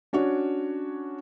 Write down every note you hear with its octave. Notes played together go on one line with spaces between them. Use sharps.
C#4 D4 F#4 C#5